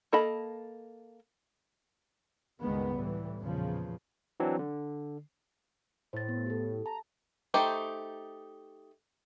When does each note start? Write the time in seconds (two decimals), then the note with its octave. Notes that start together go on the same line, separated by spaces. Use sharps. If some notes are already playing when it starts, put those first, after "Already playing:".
0.13 A#3 A4 D#5 A5 B5
2.61 C#2 G2 D#3 G#3 B3
2.96 A2 E3 G3
3.40 E2 A#2 C#3 F3
4.40 E3 F#3 C4 D4
4.59 D3
6.13 A2 C5 A6
6.28 B3
6.46 G4 A4
6.86 A5 A#5
7.54 A3 D#4 G4 C5